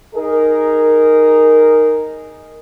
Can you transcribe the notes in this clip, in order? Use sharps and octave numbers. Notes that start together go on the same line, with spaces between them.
D#4 G#4 A#4